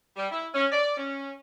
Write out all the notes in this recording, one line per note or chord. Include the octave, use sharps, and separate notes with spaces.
G3
E4
C#4
D5
C#4